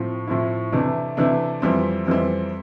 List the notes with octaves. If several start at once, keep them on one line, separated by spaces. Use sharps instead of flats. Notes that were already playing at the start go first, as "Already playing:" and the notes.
Already playing: A2 F3 C4
A2 F3 C4 E4
C3 E3 A3 D4
C3 E3 A3 D4
F2 E3 G3 C4
F2 E3 G3 C4